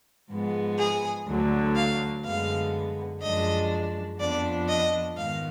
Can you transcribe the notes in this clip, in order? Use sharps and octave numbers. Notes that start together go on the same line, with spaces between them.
G#2 F3 G#3 B3
G#4
D2 D3 F#3
F5
F#2 D3 G#3 B3 F5
F#2 F3 G#3 D4 D#5
F2 F3 B3 D4 D5
D#5
G#2 D#3 G#3 B3 F5